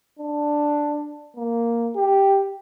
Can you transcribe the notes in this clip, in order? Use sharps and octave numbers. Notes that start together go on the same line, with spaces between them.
D4
A#3
G4